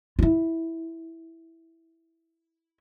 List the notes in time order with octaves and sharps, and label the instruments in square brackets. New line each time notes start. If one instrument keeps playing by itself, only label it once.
[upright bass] E4 F4